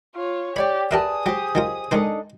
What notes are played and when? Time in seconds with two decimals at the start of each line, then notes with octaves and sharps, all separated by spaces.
0.15 F4 C#5
0.56 G4 C#5 D5 G5 B5
0.91 G4 G#4 A#4 B4 D5 E5 A5 D#6
1.26 F#3 G4 C5
1.55 D#3 F#3 F4
1.91 G#2 D#3 D4 D#4 A4 C5